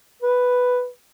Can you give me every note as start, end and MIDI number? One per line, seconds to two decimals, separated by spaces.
0.22 0.87 71